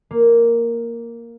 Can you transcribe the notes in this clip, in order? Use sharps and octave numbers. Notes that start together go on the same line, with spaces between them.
A#3